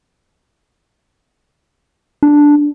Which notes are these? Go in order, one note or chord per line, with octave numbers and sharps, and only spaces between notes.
D4